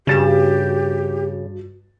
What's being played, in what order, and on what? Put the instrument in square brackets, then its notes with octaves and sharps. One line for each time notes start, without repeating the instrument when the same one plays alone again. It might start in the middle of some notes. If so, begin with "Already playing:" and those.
[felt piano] G2 A6 E7 [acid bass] C#3 [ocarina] F#4 [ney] G4